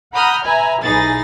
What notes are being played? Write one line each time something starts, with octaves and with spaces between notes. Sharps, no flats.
F#5 A#5 B5 D#6 F6 G6
B4 E5 G#5 A#5
B1 E3 D#4 G#4 A6 A#6